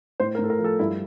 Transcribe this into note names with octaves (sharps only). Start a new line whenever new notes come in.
A2 C5
A#4
A2
A4
A#4
F3
A4
G2 E4